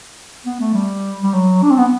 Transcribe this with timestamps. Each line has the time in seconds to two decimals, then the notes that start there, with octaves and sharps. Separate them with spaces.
0.46 B3
0.60 A3
0.74 G3
1.23 G3
1.34 F#3
1.63 D4
1.71 C4
1.77 B3